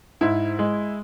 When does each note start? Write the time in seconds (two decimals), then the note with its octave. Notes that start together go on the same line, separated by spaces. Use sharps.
0.21 G#2 E4
0.59 G#3